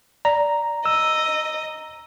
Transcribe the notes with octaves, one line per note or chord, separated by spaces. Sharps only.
D5 A#5
D#5 E6